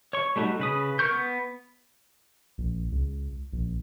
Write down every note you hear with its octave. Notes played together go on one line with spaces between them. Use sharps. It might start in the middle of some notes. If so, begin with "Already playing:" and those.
C#5 C#6
G3 A3 D#4 F#4
C#3 B4 D#6
A#4 C#6 G6
B3
A#1
C#2
A#1